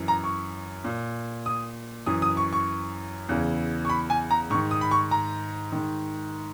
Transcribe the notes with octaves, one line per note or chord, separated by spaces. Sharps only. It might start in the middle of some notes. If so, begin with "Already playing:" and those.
Already playing: F#2 E3
A#5
C#6
A#2
D#6
F#2 E3 D#6
D#6
C#6
C#6
E2 C#3 E3
C#6
B5
G#5
A#5
G#2 D#3 C#6
D#6
B5
C#6
A#5
G#2 D#3